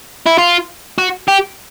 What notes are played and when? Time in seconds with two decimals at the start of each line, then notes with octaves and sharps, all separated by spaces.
0.26 E4
0.38 F4
0.98 F#4
1.28 G4